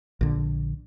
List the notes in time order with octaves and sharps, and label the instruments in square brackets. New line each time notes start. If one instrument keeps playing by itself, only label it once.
[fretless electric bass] A#1 D3